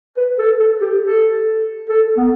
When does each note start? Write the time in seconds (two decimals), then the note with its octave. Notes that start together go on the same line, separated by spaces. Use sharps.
0.17 B4
0.39 A4
0.60 A4
0.81 G4
1.03 A4
1.89 A4
2.17 B3